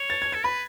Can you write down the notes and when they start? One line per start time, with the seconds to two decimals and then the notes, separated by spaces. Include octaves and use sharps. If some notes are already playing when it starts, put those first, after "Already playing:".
Already playing: C#5
0.10 A6
0.22 G#6
0.32 A4 G#6
0.44 B4 B5